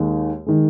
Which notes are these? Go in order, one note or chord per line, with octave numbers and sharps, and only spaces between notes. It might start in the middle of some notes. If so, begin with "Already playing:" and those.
Already playing: D#2 D#3 G#3
D#3 G#3